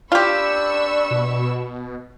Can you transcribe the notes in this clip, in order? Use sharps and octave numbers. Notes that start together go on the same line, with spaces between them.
D4 F4 G4 B5 C#6 E6
B2